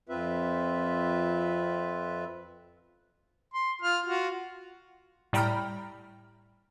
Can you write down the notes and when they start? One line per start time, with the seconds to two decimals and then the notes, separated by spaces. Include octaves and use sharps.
0.09 F2 C4 F4 B4 E5
3.53 C6
3.82 F4 F6
4.06 F4 F#4
5.33 A2 G3 G5 A#5 B5 F6